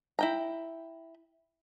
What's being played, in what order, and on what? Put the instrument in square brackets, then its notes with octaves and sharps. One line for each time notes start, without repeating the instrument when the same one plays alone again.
[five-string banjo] E4 G5 A#5